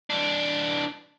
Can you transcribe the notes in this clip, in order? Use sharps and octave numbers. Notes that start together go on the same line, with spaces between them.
E3 D4